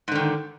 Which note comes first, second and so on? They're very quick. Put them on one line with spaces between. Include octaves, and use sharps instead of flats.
G#2 D3 D#3